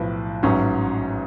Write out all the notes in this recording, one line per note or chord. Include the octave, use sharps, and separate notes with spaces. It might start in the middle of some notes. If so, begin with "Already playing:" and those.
Already playing: B1 A2 F3 B4
A1 G#2 F#3 C#4